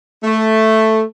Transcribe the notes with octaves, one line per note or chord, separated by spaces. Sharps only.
A3